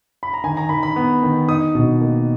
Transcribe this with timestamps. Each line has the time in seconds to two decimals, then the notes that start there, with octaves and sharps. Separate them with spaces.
0.23 B5
0.34 A#5
0.44 D#3 G#5
0.57 A#5
0.69 D#3 B5
0.83 B5
0.96 B3
1.22 D#3
1.48 D#4 D#6
1.75 B2
2.01 A#3